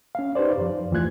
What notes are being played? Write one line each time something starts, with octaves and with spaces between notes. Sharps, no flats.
C#4 F5
D#4 G4 B4 C5 D5
F#2 F3
D#2 E3 A3 F4 F#6 G#6